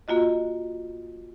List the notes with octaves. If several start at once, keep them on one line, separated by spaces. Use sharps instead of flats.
A#3 F4 F#4 D#5